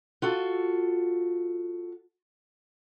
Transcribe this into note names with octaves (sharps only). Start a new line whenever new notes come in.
F4 F#4 A4